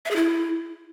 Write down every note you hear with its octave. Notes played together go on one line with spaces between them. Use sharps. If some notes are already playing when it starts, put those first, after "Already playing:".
E5
G#4
E4